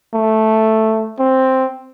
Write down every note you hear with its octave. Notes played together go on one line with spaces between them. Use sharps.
A3
C4